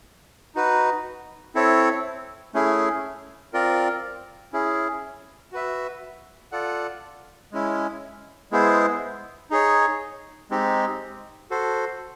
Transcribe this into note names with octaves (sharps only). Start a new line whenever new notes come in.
D#4 F#4 B4
C4 E4 A4 C#5
A3 C#4 E4 G#4
C4 F4 A#4 D5
C#4 E4 G#4
F#4 B4 E5
F4 A4 D5 F#5
G#3 C#4 E4
G#3 B3 E4 G#4 C5
D#4 G#4 C#5
G#3 C4 D#4 G4
F#4 A4 C5